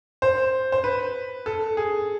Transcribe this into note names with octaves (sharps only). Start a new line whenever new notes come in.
C5
C5
B4
A4
G#4